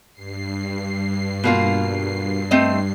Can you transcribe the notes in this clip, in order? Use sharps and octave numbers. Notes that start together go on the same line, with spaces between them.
G2 C7
B2 A#3 F4
A3 C4 D#5